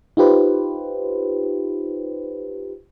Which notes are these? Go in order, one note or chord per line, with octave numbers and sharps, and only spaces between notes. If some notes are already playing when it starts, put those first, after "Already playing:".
D#4 F4 G4 B4 C5